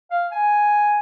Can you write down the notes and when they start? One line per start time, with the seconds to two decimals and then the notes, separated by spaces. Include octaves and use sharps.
0.11 F5
0.32 G#5